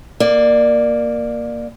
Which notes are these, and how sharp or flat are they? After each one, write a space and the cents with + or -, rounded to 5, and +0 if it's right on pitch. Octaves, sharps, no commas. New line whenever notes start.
A#3 +0 D5 +20